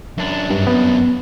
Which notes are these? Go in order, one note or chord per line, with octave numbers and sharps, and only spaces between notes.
F#2 D4
G2
B3